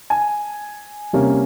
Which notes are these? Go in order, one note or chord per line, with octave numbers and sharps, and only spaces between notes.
G#5
C3 G3 A#3 C#4